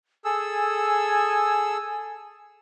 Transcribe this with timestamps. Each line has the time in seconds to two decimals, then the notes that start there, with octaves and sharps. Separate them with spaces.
0.25 G#4 A4 G#5 E6